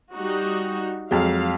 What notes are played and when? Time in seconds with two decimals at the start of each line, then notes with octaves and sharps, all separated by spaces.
0.12 G3 D#4 F#4
1.11 F2 F#3 G#3 F5